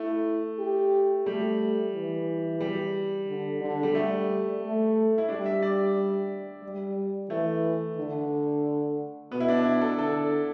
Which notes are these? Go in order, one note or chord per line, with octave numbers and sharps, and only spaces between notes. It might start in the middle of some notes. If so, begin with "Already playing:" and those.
Already playing: A3 E4
G4
G3 A3
E3
G3
D3
D3
G3
G3 A3
A3
E4
G3 D4
E5
D5
G3
E3 A3
D3
B2 B3
E4
D4
E4
A4
D3 A4